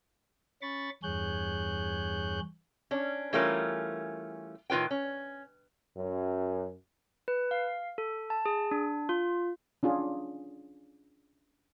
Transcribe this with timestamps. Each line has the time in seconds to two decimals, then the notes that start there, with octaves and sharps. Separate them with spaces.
0.62 C#4 B5 C#6 A6
1.03 E2 G2 G#4 C#5 F#6 G6
2.91 C#4 D4
3.33 E3 G3 A3 C#4 F4 A#4
4.70 A2 D#3 F4 B4 G5
4.91 C#4
5.97 F#2
7.28 B4
7.51 F5
7.98 A4
8.30 A5
8.46 G#4
8.71 D4
9.09 F4
9.83 C#4 D4 F4 G#4